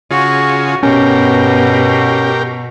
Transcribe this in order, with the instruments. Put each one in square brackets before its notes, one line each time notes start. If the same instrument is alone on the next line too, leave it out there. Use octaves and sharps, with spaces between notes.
[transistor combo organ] C#3 F4 G#4 [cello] F#4
[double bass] G2 B3 [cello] B2 [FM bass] C#4 [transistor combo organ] G4 A#4